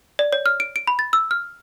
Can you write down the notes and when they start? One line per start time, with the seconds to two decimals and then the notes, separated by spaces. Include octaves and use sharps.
0.19 D5
0.33 C#5
0.46 F6
0.60 D7
0.76 D7
0.87 B5
0.99 A6
1.13 E6
1.31 F6